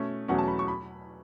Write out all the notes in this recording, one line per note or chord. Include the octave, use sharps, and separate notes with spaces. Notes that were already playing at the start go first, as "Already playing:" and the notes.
Already playing: B2 A3 C#4
E2 B2 F#3 A3 C#4 F#5
A5
B5
C#6
B5